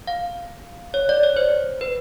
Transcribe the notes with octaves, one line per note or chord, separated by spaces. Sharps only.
F5
C#5
D5
C#5
C5
B4